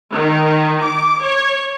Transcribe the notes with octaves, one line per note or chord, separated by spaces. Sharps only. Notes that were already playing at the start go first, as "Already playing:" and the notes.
D#3
D6
C#5